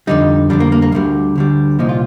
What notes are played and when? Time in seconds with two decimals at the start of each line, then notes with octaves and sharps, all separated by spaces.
0.07 F2 D3 G3 D#4
0.50 F2 D3 G3 D4
0.60 A#3
0.72 A#3
0.82 A#3
0.92 D2 D3 G3
1.35 D2 D3 G3
1.79 C2 A#2 F3 D#4
1.89 F4